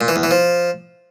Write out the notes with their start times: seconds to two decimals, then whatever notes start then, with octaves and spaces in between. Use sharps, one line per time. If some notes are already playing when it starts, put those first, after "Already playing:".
0.01 A#2
0.08 E3
0.16 E2
0.23 E3
0.31 F3